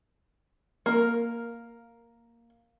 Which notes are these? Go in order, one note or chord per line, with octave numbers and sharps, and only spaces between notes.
A#3 A#4